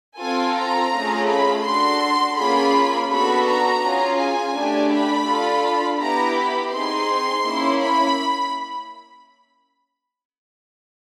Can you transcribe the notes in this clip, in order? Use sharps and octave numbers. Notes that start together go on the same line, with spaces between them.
C4 F4 A4 G#5
A#5
A3 C#4 F4 G#4
B5
D4 F#4 A4 C6
A#3 C#4 F4 G#4 B5
B3 D4 F#4 A4 B5
A#5
C#4 F4 G#4
G#5
A3 D4 G4
B5
D4 F4 A4
B3 E4 G4 A#5
B5
C4 D#4 G#4 C6
A#3 C#4 E4
B5